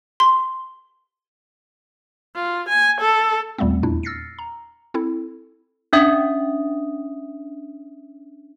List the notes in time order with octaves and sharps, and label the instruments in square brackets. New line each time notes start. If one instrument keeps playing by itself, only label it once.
[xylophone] C6
[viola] F4
G#5
A4
[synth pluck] D#2 A#2 G3 A3 B3 C4
E2 A#2 D4 E4
E6 F6 A6 A#6 C7 C#7
A#5
C4 E4 A4
[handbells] C#4 D4 E5 D#6